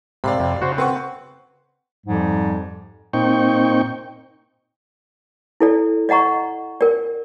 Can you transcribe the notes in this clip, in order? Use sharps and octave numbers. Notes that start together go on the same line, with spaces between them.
G#2 C3 D5 F5 B5
F2 C3
C#3 F#4 C5
C4 B4 F#5 C#6
F2 G#2 F3 G3
A#2 C4 D#4 G5 C#6
E4 A4 D5
D5 D#5 F#5 A#5 C#6
A#4 D5